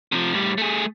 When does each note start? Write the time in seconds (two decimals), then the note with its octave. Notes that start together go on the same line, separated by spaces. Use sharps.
0.12 C3 F3
0.34 A2 G3
0.58 A3 G#4